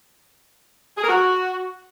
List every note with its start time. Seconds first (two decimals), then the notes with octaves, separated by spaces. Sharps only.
0.97 G#4
1.03 A#4
1.08 F#4